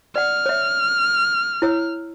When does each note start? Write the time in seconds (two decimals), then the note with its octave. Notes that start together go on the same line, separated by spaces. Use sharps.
0.16 D5 F#5 F6
0.46 C#5 E5
1.62 E4 C#5 E6